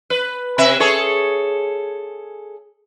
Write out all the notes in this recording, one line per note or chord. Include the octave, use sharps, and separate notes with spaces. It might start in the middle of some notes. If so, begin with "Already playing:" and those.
B4
C3 B4 E5
G#4 A4 C#5